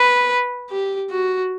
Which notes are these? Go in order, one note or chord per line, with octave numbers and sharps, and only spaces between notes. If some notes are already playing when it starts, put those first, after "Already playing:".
Already playing: B4
G4
F#4